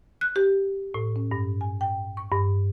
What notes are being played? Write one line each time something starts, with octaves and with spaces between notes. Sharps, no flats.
F#6
G4
A2
C#4
G2
G#5
G5
C#6
G2